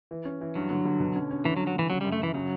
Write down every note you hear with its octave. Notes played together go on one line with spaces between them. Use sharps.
E3
C#4
E3
G2 F#3
D3
D3
B2
C#4
C#4
D3 E3
F#3
G2
F#3
D3 E3
C#3 F#3
G3
F#2
A3
F#2 E3
C#3 F#3